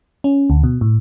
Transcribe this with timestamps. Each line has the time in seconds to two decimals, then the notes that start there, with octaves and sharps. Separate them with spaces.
0.24 C#4
0.50 D2
0.64 B2
0.81 A2